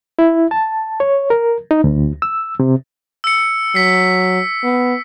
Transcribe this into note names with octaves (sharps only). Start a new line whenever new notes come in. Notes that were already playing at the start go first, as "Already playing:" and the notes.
E4
A5
C#5
A#4
D#4
D2
E6
C3
E6 C#7
F#3 B6 C7
B3